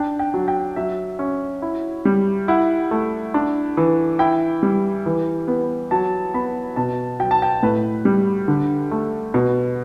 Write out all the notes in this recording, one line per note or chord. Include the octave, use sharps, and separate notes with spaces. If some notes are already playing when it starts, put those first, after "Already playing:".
Already playing: D4 G5
G5
F#3
G5
F#3 E5
C#4
E4
G3
E4 F#5
A3
D4
E3
E4 G5
G3
E3
B3
F#3 A5
B3 B5
B2 A5
F#3 G5
A5
G5
A2 B4
G3
D3
A3
B2